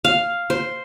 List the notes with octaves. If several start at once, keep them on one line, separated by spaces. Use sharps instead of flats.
F5
C5